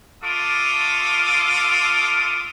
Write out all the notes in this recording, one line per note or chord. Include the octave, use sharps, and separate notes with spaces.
A3 F4 A4 C6 D6 D#6